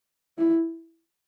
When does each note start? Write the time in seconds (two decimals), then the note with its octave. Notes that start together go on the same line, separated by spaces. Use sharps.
0.38 E4